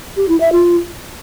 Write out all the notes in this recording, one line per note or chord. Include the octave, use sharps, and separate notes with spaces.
G4
E4
E5
F4